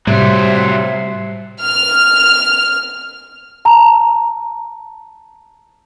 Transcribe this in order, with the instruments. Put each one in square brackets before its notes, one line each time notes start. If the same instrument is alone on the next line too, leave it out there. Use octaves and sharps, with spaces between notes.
[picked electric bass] A2 C3 [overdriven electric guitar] F#3 C5 [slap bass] G3 [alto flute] E5
[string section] F6
[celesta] A5 A#5